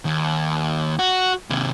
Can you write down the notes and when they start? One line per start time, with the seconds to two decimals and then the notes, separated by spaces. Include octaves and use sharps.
0.05 D#2
0.99 F#4
1.50 D#2 C3